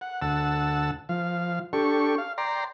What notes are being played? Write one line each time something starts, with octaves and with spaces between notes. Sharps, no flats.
F#5
D2 F#5 A5 E6
F3 F5
D4 G4 A4 C#6
F5
D5 G5 A#5 C6